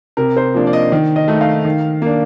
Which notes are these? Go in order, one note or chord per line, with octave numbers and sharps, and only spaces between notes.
C3 A#4
C5
F3 A#3 D4
D5
D#5
D#3
D#5
A3 D#4
F5
D#3
A#3 D4